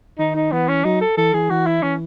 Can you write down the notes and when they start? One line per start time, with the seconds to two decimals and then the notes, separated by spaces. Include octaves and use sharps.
0.19 D#3 D#4
0.35 D#4
0.52 E3 B3
0.68 C#4
0.85 F#3 D#4
1.01 A4
1.17 E3 A4
1.34 E3 G#4
1.50 E3 F#4
1.67 E4
1.82 E3 C#4